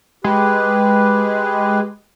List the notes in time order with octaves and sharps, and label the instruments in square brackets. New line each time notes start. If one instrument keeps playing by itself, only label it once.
[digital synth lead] G#3 [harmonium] G4 B4